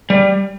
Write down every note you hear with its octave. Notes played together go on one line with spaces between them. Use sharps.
G3